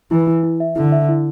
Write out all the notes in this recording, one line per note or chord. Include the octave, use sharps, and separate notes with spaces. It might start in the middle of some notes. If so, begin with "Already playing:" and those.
E3 E4
E4
E4
E5
D3 E4
E5
E4